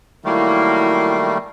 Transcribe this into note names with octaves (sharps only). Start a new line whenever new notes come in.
D#3 F#3 G3 A3 A#3 E4